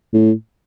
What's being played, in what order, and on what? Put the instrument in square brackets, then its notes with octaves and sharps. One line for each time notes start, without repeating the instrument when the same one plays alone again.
[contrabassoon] A2